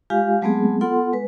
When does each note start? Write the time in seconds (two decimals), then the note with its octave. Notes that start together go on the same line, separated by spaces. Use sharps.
0.10 G#3 F4 G4 F5 G#5
0.42 F#3 G#3 A3 B3 C4 G#4
0.81 B3 F4 A4 F#5 C6
1.13 G#3 B4